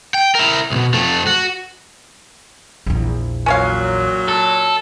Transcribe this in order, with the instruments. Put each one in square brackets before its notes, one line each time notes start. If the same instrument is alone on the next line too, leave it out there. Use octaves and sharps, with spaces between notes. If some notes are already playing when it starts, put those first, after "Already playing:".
[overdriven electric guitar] G5
E4 A#4
B1 B2
F2 A3
F#4
[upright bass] A#1 E2
[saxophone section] A#2 F#3 [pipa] C#4 C#5 F5
[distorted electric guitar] A4